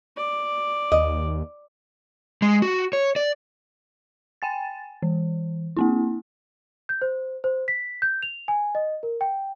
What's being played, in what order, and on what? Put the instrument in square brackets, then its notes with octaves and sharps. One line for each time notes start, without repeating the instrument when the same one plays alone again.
[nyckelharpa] D5
[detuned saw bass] D#2 [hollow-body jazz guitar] D#5
[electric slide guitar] G#3
F#4
C#5
D5
[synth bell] G5 G#5 A6
E3
A#3 C4 E4
[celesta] G6
C5
C5
B6
G6
F7
G#5
D#5
A#4
G5